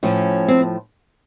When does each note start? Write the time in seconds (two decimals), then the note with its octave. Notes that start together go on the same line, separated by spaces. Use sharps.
0.03 A2 F3 C#4
0.48 C4